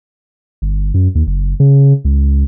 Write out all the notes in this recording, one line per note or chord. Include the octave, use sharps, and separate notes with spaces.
G1
F#2
D#2
F#1
C#3
C#2